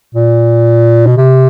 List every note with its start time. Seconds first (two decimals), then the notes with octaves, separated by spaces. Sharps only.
0.15 A#2
1.07 B2
1.18 C3